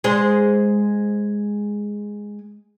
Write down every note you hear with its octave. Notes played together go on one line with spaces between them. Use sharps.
G#3 C5